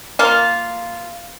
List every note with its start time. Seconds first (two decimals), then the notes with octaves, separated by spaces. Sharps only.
0.19 A#3 F4